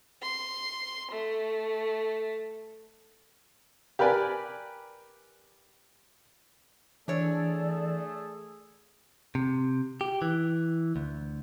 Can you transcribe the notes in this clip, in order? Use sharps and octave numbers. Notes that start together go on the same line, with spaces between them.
C6
A3
G4 A#4 B4 D5 G#5
E3 A3 D4 G#4 A4 C#5 D5 A6
C3
G4
E3
D2